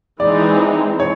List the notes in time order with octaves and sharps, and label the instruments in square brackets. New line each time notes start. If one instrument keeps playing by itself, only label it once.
[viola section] E3 G#3 C4 D#4 [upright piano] D5
[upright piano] C#5